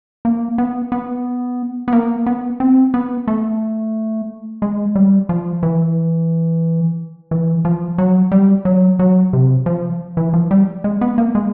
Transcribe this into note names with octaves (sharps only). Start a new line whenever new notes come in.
A#3
B3
B3
B3
A#3
B3
C4
B3
A3
G#3
G3
F3
E3
E3
F3
F#3
G3
F#3
F#3
C3
F3
E3
F3
G3
G#3
B3
A#3
G#3